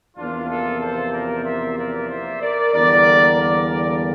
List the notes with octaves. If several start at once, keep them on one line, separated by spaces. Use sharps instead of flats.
E2 C3 F3 A#3 D4 F4
F4 A4
A4 C5
A#4 D5
C5 E5
A#4 D5
C5 E5
A#4 D5
E2 D3 G3 A#3 A#4 D5
A#4 D5
A#4 D5